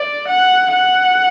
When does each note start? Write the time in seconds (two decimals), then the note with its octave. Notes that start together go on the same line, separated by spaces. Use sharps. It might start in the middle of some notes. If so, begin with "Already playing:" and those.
Already playing: D5
0.28 F#5
0.72 F#5